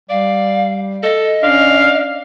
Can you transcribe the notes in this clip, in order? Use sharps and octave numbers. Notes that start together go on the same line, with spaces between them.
G3 D5 F5
A4 D#5
C#4 D4 F5